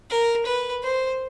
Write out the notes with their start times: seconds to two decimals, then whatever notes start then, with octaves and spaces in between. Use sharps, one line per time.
0.10 A#4
0.46 B4
0.83 C5